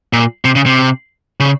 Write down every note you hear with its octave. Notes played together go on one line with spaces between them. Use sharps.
A#2
C3
C#3
C3
C#3